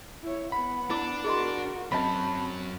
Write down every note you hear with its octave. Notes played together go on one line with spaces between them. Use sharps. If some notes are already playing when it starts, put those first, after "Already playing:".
E4 C#5
B3 F#5 B5
D4 E4 A#4 D6
F#4 G#4 A#4 D#5 C6
F#2 F#3 C4 C#5 D#5 E5 A5 B5